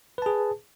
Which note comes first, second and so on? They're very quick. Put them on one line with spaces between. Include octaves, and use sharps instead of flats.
B4 A5 G#4